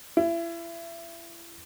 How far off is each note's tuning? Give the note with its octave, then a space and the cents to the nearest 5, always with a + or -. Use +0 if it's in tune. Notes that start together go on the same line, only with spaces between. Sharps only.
E4 +30